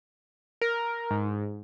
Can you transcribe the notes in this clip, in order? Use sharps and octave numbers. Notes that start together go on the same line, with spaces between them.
A#4
G#2